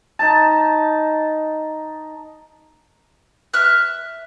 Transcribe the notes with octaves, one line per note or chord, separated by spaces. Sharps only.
D#4 A5
E5 F6 F#6